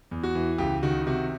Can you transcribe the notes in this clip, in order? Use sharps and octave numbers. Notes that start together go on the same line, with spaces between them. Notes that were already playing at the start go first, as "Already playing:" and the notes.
E2
F#4
E3
C#2 G4
D#3 F#4
C3 F#4